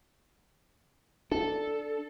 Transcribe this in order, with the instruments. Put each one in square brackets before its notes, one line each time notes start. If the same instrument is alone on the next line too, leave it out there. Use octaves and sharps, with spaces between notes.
[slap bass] D4 [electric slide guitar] A4